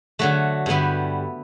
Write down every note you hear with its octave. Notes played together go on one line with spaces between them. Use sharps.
D3 F#3 A3 F#4
G2 D3 G3 B3 E4